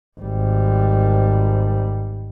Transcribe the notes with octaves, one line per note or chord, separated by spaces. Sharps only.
G#1 G3